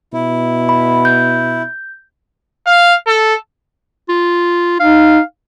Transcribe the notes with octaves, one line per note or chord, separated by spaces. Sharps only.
B2 E4
B5
G6
F5
A4
F4
D#4 F5